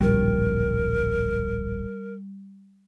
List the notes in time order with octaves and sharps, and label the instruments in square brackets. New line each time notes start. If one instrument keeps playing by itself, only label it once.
[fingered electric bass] D1 A#1 [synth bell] G3 [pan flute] A#4